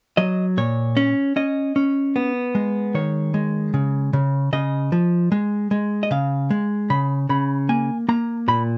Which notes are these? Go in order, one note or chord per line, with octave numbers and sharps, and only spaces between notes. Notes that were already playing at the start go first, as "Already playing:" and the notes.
F#3 D#5
A#2 C#5
C#4
C#4 D#5
C#4
B3
G#3
D#3 C#5
G#3
C#3
C#3
C#3 D#5
F3
G#3
G#3
D#5
C#3 F5
G#3
C#3 B5
C#3 B5
A#3 G#5
A#3 A#5
A#2 B5